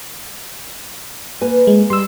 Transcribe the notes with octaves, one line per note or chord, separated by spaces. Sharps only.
A#3 B4 G#5
G#3
G3 C6 E6